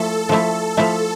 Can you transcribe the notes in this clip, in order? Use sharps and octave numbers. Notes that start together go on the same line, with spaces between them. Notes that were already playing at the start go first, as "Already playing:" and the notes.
Already playing: F3 A3 E4 A4
F3 A3 E4
F3 A3 E4